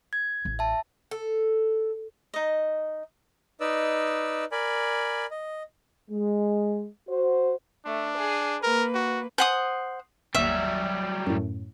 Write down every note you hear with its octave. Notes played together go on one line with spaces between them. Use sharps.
G#6
A1
E5 A5
A4
D#4 D#5
D#4 B4 D5 D#5 E6
A#4 D5 G#5 B5
D#5
G#3
F#4 C5
A3 D4
G#4
A#3 A#4 B4
F#4
C5 F#5 G#5 D#6
G1 D#2 F#3 G3 E5
F#2 A2